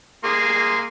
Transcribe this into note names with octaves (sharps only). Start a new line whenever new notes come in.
A#3 G#4 C6